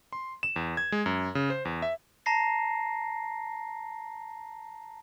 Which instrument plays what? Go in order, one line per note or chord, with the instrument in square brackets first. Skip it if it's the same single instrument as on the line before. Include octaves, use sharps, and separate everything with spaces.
[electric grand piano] C6
E7
E2
G#6
G#3
F#2
C#3
C5
E2
E5
[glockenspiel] A5 A#5 A#6 C7